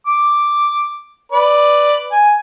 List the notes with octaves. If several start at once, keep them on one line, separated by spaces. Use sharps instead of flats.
D6
B4 D5
G#5